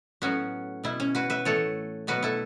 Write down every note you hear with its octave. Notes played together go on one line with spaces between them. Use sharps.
A2 F#3 B3 C#4 F#4
B2 B3 E4
C#4
F#4 B4
B4 E5
A2 E3 A3 A4 C#5
B2 F#3 B3 F#4 B4
E4 A4